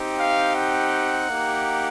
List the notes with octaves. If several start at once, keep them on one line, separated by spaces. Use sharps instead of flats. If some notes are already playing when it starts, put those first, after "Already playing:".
Already playing: C4 D#4 G4
F5
F#5
A#3 D#4 G4